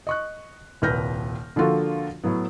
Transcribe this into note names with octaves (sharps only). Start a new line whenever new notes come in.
D#5 C#6 F#6
D#1 C2 B4 F6 G6 A#6
D3 F3 A#3 F4 F#4 A4
A2 F#3 B3